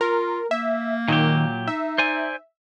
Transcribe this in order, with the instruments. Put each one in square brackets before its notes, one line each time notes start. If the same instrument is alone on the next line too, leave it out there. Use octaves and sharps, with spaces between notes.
[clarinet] F4 [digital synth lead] A#4
[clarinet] A#3 [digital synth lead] E5
[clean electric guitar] A#2 F#3 G4 [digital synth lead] D#3
[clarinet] D#4 [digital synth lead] E5
[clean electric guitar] C5 D5 G#5